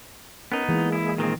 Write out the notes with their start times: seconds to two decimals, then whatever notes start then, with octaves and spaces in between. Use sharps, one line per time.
0.52 B3 C#4 D#4 A#4
0.69 E3 G#3 A#3 G#4
0.92 E4
1.18 A#2 D#3 C4